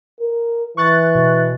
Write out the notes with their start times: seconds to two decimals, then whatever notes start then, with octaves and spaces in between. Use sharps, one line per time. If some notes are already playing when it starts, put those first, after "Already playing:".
0.20 A#4
0.77 E3 C#6 F#6 A6
1.15 B2